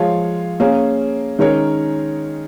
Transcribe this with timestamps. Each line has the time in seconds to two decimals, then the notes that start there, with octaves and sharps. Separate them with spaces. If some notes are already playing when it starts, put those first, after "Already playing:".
Already playing: F3 G#3 F4 C#5 F5
0.60 A#3 C#4 G#4 F5
1.39 D#3 G#3 C#4 A#4 C#5